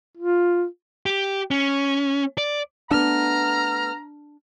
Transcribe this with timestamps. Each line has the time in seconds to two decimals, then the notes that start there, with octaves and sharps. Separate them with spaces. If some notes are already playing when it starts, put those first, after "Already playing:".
0.18 F4
1.06 G4
1.51 C#4
2.38 D5
2.91 A3 B3 D4 A#5 F6